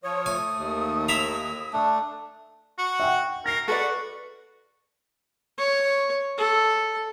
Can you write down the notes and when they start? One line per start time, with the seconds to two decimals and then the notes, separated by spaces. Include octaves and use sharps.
0.04 F3 C#5 D#6
0.26 A3 G#5
0.56 D#2
1.09 E4 E5 A#5
1.73 A3 D4
2.79 F#4
3.00 E5 F#5 G5
3.46 A#4 A#6 C7
3.68 F#4 A4 B4 D5
5.58 C#5
6.38 A4